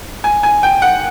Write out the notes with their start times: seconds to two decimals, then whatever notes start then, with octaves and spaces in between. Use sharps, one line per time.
0.24 G#5
0.43 G#5
0.63 G5
0.82 F#5